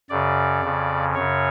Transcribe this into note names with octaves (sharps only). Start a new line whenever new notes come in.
F#2 C#3 D5
F2 C#3
F#2 C#3 C#5